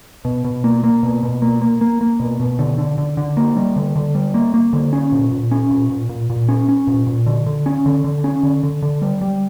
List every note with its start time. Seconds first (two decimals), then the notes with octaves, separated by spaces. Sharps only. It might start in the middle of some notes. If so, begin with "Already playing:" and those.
0.25 B2
0.45 B2
0.64 A#3
0.84 A#3
1.03 B2
1.23 B2
1.42 A#3
1.62 A#3
1.81 A#3
2.01 A#3
2.20 B2
2.40 B2
2.59 D3
2.78 D3
2.98 D3
3.17 D3
3.37 A#3
3.57 G3
3.76 D3
3.96 D3
4.15 G3
4.34 A#3
4.54 A#3
4.73 D3
4.93 C#4
5.12 A#2
5.32 A#2
5.51 C#4
5.71 A#2
5.90 A#2
6.09 A#2
6.30 A#2
6.49 C#4
6.68 C#4
6.87 A#2
7.07 A#2
7.26 D3
7.46 D3
7.66 C#4
7.86 D3
8.04 D3
8.24 C#4
8.43 D3
8.63 D3
8.83 D3
9.02 G3
9.21 G3